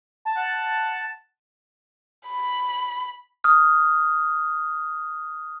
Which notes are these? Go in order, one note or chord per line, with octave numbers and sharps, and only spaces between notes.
A5
F#5
B5
D#6 F6